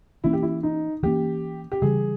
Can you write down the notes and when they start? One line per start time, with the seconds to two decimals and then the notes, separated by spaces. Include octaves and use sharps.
0.24 E3 A#3 C#4 E4
0.33 G4
0.42 E4
0.63 D#4
1.03 E3 A#3 C#4 G4
1.72 G4
1.82 C#3 E3 G3 G#4